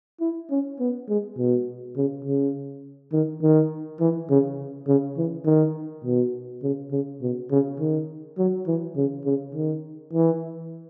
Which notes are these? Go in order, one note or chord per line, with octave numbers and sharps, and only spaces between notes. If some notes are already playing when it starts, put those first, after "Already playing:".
E4
C#4
B3
G#3
B2
C#3
C#3
D#3
D#3
E3
C#3
C#3
E3
D#3
B2
C#3
C#3
B2
C#3
D#3
F#3
E3
C#3
C#3
D#3
E3